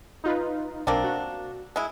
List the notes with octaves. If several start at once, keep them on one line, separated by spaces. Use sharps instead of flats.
D#4 F4 B4
B1 A#3 C4 D4
F#4
G#3 E4